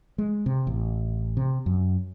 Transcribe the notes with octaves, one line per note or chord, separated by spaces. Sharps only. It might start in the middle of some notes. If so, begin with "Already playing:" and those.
G#3
C3
A1
C3
F#2